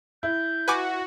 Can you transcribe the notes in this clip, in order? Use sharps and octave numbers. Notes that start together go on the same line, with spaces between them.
E4 G6
F#4 B4 G#5 D6